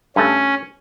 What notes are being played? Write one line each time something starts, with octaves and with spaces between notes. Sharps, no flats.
G2 A3 C#4